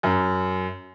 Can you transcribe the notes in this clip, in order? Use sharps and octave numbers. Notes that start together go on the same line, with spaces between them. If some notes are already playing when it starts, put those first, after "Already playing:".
F#2